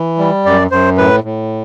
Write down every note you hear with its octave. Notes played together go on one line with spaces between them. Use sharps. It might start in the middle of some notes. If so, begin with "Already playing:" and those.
Already playing: E3
G3
F#2 D5
F#2 C5
A2 B4
A2